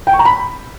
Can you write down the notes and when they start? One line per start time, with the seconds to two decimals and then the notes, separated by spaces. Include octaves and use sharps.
0.07 G5
0.13 C#6
0.19 A#5
0.25 B5